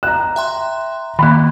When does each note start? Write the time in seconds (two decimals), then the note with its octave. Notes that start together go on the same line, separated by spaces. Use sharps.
0.03 A#5 F#6 E7
0.36 E5 G5 C6
1.19 D#3 A#3 B5 F#6